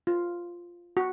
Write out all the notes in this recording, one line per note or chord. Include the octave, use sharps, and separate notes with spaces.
F4
F#4